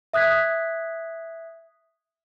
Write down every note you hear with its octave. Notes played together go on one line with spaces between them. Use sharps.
E5 D#6 F#6 G#6 B6